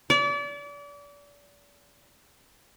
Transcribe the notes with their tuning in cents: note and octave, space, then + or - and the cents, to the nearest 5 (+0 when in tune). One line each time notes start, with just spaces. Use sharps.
D5 -35